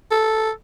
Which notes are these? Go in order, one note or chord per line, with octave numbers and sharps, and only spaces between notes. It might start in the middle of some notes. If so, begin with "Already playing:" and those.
A4